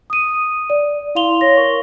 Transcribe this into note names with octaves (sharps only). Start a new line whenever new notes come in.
D#6 D#7
D5
E4 F5 C6 F7 G7
C#5 A#6
A#4 C#6